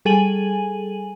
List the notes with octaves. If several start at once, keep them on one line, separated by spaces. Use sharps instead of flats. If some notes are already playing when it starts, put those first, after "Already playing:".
G3 G#4 A4 G#5 D#7 F#7